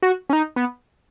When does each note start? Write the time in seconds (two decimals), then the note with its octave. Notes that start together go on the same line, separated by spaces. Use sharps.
0.02 F#4
0.30 C#4
0.33 D#4
0.56 B3